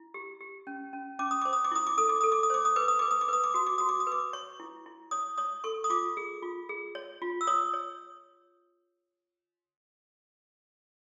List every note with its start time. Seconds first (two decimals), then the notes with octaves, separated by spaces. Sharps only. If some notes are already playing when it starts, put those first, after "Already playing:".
Already playing: E4
0.14 G4
0.41 G4
0.67 C#4
0.93 C#4
1.19 C#4 D6
1.31 D#6
1.42 C5 D6
1.53 D#6
1.64 D6
1.72 E4 D#6
1.87 D6
1.98 A4 D#6
2.09 D6
2.21 A4 D#6
2.32 D6
2.43 D#6
2.50 C5 D6
2.65 D#6
2.76 B4 D6
2.88 D#6
2.99 B4 D6
3.11 D#6
3.21 D6
3.28 B4 D#6
3.44 D6
3.54 F#4 D#6
3.67 D6
3.78 F#4 D#6
3.89 D6
4.00 D#6
4.07 B4 D6
4.33 C#5 C#6
4.60 E4
4.86 E4
5.11 C#5 D#6
5.38 C#5 D#6
5.64 A4 C#6
5.84 D#6
5.90 F4 D6
6.17 G#4
6.43 F4
6.69 G#4
6.95 C#5
7.22 F4
7.41 E6
7.47 C#5 D#6
7.74 C#5